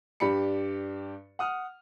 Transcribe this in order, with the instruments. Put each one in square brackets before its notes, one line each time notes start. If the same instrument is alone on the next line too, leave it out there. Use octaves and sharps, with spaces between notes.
[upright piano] G2 G4 D5 B5 C#7
F#5 D#6 F6